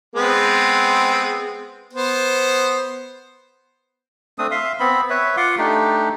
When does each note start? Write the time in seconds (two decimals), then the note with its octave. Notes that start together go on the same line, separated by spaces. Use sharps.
0.16 G#3 B3 C4
1.93 B3 C5
4.38 A3 C4 D4 D#6
4.51 E5 F5 C6
4.80 B3 C4 B5
5.10 B4 C#5 E5
5.37 F4 F#5 C6 D6
5.58 A3 D4 D#4 G4